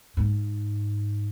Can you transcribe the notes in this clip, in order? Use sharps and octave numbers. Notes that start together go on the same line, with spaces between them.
G#2